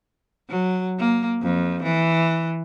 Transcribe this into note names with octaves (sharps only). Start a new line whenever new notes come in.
F#3
A#3
F2
E3